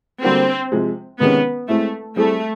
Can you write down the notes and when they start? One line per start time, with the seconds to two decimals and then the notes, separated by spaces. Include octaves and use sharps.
0.24 D3 G3 A#3 C4 D4 F#4
0.72 C3 F3 G#3
1.20 C3 D#3 G#3 B3 C#4
1.68 G#3 A3 C4 E4
2.16 G3 A3 C4 E4 G#4